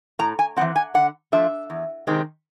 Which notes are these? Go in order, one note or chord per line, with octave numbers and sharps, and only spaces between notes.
A2 A#5
G#5
E3 G#3 C4 F#5
G#5
D3 F#5
F3 A3 D4 F4 E5
E2
C3 D#3 G#3 C4